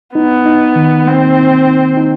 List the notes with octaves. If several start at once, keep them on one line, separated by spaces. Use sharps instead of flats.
B3 D#4
D#4
D#3
A#3 C4
D#4
D#4
D#4